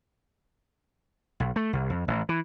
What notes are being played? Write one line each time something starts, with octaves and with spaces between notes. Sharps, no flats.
B1
A3
C2
F2
A1
E3